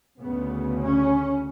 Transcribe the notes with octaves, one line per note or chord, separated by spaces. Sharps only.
D2 C#3 B3
C#4